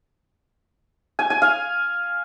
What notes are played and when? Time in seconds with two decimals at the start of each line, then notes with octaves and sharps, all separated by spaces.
1.19 G#5
1.30 G#5
1.42 F5